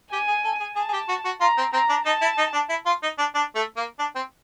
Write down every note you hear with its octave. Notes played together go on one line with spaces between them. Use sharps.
G4 G#5
G#4
A4
G#4
G#4 A5
G#4
G4
F#4
F#4
F4 A#5
C4
C4 A#5
D4
D#4 A5
E4
D#4
D4
E4
F4
D#4
D4
D4
A3
A#3
D4
C4